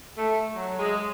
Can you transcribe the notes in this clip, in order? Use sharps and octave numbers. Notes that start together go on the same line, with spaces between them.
A3
F#3
G#3